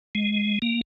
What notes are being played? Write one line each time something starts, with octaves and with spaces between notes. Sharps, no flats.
G#3
A#3